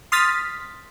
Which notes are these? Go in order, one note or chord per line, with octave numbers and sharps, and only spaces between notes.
C6 D#6 F6 A6 B6